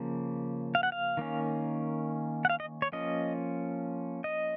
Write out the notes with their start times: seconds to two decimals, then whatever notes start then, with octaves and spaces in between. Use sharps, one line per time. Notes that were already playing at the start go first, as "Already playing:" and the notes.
Already playing: C#3 F3 A#3
0.75 F5
0.83 F#5
0.92 F5
1.17 D#3 A#3 C#4
2.45 F#5
2.50 F5
2.60 D#5
2.82 C#5
2.92 F3 A#3 C#4 D#5
4.24 D#5